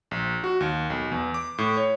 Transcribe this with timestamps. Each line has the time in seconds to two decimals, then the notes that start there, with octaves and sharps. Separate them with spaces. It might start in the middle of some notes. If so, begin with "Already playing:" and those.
0.11 A#1
0.44 F#4
0.60 D#2
0.90 B1
1.12 E2
1.34 D6
1.58 A2
1.77 C#5